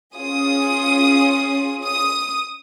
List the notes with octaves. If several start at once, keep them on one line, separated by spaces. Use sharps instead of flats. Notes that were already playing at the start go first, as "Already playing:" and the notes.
C#4 F4 G#4 D#6
D#6